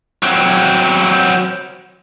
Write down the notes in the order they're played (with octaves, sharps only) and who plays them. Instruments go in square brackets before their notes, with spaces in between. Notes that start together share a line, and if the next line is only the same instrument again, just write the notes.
[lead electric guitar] F#3 C4